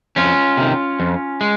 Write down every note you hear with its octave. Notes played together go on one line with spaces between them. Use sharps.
F2 C#4 F4
C3 D#3
F2
G#3